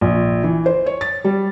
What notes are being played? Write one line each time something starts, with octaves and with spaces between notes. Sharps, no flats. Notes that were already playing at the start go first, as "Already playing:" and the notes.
A#1
E3
C5
C#5
A6
G3